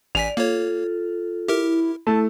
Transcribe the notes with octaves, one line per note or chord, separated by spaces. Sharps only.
A1 D5 G#5 B6 F7
A#3 F4 A4 C#5
E4 G4 A#4
A3 E4 A5